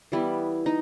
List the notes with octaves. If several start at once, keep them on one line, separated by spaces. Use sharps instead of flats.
E3 G3 B3 E4
D#4